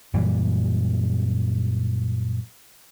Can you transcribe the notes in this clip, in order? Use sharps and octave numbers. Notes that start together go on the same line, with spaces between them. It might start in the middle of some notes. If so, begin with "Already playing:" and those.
F#2 A#2 E3 G3